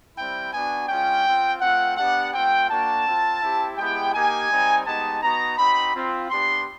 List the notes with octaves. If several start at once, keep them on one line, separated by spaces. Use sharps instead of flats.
G3 C4 E4 G5
B3 D4 F#4 G#5
G#3 C#4 F4 G5
C4 F4
A3 C4 F4 F#5
B3 D4 G4 F#5
A3 C4 F4 G5
A#3 D4 F#4 A5
C4 F4
C4 E4 G4
G#3 B3 E4 G4 G5
A#3 D#4 G4 G#5
G3 C4 D#4
G#3 B3 D#4 G4 A5
B3 D#4 F#4 A#5
C4 D#4 F#4 B5
C4 F4
B3 D4 G4 C6